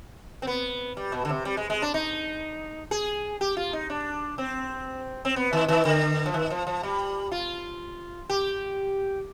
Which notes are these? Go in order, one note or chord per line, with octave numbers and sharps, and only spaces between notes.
C4
B3
G3
B2
D3
C3
G3
G#3
G#3
D4
D#4
G#4
G4
F4
D#4
D4
C4
C4
B3
D#3
D#3
D3
F3
D#3
F3
F3
G3
F4
G4